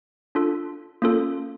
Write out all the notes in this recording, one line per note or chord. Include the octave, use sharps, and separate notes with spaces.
D4 F4 A4
A#3 C#4 F4 A4